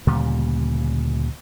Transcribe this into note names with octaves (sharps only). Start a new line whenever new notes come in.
D2 A#2 C#3 G3